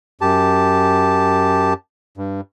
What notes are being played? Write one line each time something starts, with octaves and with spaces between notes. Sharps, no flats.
F#2 G4 A5
G2